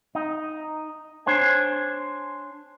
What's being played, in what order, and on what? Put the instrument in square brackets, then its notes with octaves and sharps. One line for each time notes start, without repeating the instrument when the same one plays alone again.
[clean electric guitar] D#4
D4 C5 C#5 G#5